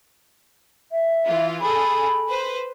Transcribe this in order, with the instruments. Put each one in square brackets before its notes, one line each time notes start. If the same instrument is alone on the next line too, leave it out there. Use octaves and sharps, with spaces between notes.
[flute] E5
[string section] E3 F4
[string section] G#4 A4 [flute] B5
[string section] B4 C5